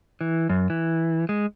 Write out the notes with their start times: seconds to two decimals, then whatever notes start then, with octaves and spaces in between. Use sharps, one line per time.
0.21 E3
0.49 F#2
0.70 E3
1.29 G#3